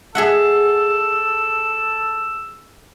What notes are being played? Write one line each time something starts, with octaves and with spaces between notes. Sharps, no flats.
G#4 A4 E5 F#5 E6